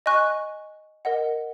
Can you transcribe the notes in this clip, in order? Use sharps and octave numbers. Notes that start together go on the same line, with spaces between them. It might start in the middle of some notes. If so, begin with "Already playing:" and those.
D#5 G#5 C#6 F#6
A#4 D#5 F#5